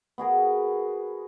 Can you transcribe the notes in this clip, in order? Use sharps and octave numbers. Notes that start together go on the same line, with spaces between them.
B3 F#4 G#4 A#4